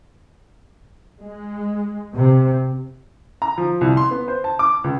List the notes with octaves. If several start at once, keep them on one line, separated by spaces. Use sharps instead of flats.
G#3
C3
A#5
F3
C2
C6
B3
C5
A5
D6
C#2